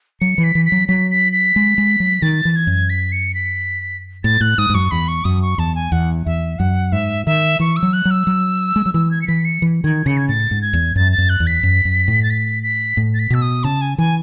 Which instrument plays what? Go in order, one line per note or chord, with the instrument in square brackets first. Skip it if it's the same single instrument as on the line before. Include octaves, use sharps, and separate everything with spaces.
[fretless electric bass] F#3 [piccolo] C#7
[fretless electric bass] E3
[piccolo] B6
[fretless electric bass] E3
[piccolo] B6
[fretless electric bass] F#3
[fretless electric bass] F#3 [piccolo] B6
[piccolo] B6
B6
[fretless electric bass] G#3
G#3
F#3
[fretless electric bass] D#3 [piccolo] A6
[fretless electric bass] E3
[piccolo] G#6
[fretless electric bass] F#2
[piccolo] B6
C#7
B6
[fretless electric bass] A2 [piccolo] A6
[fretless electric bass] A2 [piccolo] F#6
[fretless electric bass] G#2 [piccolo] D#6
[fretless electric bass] G#2
[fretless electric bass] F#2 [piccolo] C#6
[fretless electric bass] E2 [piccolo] B5
[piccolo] C#6
[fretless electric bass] F#2 [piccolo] D#6
[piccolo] C#6
[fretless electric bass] E2 [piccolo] A5
[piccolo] G#5
[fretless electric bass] E2 [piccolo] F#5
[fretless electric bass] E2 [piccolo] E5
[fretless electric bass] F#2 [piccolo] F#5
[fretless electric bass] G#2 [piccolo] E5
[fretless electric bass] D#3 [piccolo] E5
[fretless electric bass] E3 [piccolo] C#6
[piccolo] E6
[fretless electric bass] F#3
[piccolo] F#6
[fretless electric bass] F#3
[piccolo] E6
[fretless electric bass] F#3
G#3
F#3
[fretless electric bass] E3 [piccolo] E6
[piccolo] G#6
C#7
[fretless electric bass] E3 [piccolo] B6
[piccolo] C#7
[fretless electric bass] E3
[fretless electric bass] D#3 [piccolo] G#6
[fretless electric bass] C#3 [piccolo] C#7
[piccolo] G#6
[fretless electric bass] A2 [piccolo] A6
[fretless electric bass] G#2
[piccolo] G#6
[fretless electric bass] E2
[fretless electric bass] F#2 [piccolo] A6
[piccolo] A6
[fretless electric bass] F#2
[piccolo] F#6
[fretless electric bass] E2
[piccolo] B6
[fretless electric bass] F#2
F#2
A2
[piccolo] A6
B6
B6
[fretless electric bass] A2
[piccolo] A6
B6
[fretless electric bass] B2 [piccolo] E6
[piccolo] D#6
[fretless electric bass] C#3 [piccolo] A5
[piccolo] G#5
[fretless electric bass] E3 [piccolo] G#5